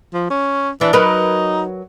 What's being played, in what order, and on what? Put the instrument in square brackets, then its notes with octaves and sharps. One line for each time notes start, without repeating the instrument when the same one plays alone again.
[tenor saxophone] F3
C#4
[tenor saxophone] E3 [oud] D4
[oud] F#3 A#4 B4 [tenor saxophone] D#4